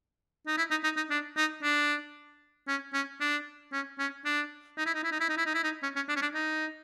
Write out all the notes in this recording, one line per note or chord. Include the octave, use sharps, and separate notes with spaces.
D#4
E4
D#4
D#4
D#4
D4
D#4
D4
C#4
C#4
D4
C#4
C#4
D4
D#4
E4
D#4
E4
D#4
E4
D#4
E4
D#4
E4
D#4
C#4
C#4
D4
C#4
D4
D#4